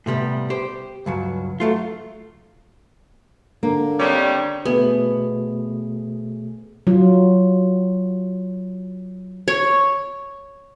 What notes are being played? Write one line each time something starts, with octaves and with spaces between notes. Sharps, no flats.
A2 C3 G3 B3
G4 C5
C#2 G2 F#3
F#3 A3 F4
D3 A#3
D#3 G3 C4 D4 C#5
B2 A3 B3 G#4
F#3 F4
C#5